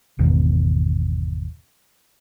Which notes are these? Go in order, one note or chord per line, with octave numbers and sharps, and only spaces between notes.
G#1 E2 B2 D#3